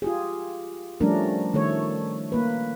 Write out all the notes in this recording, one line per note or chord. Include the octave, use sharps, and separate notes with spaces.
F4 G4 G#4
F3 G3 A3 C#4 D4 A#4
D#3 A3 A4 C#5
A#3 B4